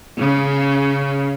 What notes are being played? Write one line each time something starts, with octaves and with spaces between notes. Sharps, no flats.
C#3